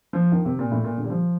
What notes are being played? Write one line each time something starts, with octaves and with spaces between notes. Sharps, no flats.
F3
D#3
C3
A#2
A2
A#2
D3
G3
F3